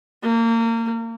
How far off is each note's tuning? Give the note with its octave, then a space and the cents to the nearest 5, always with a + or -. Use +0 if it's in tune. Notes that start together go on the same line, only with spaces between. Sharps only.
A#3 -30